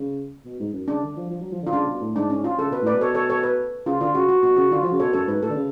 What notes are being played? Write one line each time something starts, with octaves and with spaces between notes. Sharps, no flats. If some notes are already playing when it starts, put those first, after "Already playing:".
Already playing: C#3
B2
G#2
F#2
C#3 D4
D3
F3
F3
F#3
F3
D3
F4
C#3 D4
B2
A2
G#2 D4
C#4
F4
C#3 A4
B2 B4
A2 B4 D5
B2
A4 C#5
A4 C#5
A4 C#5
B4
C#3 F4
D3 F4
C#3 F#4
F#4
B2 F#4
C#3 F#4
D3 F4
F3
F#4
C#3
A4 C#5
B2
F#2 A4 C#5
G#2 B4
A2 A4
D3
C#3